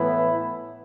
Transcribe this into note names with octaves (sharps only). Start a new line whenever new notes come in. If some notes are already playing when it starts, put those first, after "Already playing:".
Already playing: A2 E3 B3 E4